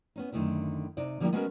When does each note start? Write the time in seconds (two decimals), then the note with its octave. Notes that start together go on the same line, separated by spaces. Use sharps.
0.16 B3 C#4 D#4
0.33 F#2 D3 D#3 F3 A3 E4
0.97 C3 D#4 D5
1.20 D3 F3 G3 A#3 E4 G4
1.33 G#3 B3 C#4 F#4 A4 A#4